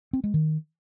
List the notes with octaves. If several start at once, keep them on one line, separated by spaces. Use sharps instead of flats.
C4
G#3
D#3